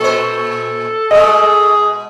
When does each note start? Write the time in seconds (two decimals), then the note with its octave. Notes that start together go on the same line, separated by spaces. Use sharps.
0.01 A#2 A4 C5
1.11 B2 G#3 G#4 D#5